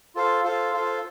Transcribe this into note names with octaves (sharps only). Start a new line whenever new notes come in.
F4 A4 C5 F5
F4 A4 C5 F5
F4 A4 C5 F5